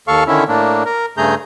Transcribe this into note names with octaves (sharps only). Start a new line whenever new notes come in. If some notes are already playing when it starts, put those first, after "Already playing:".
D#2 A4 F5 C#6
D3 D#3 C#4 E4
A2 A#3 D4
A#4
G2 C#3 A3 G#4 A#5 G6